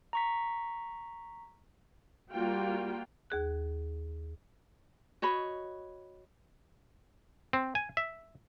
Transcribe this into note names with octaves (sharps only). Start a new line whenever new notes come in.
A#5 C#6 B6
G3 A#3 F4 F#4 F5 G5
D#2 G#4 F#6
F#4 C#5 D#5 B5
C4
G#5
E5